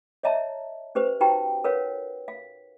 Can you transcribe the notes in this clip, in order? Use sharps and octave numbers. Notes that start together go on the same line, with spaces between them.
C#5 D#5 E5 A5 A#5
C#4 G4 B4 C5
D#4 F#4 G4 B4 G5 A#5
A#4 B4 C#5 F5 F#5
F5